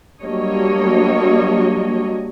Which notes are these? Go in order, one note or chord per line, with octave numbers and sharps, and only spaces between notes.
F#3 G3 A#3 D4 C#5 D#5